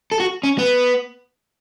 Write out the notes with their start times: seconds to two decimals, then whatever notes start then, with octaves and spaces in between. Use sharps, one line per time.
0.12 A4
0.20 F#4
0.43 C#4
0.58 B3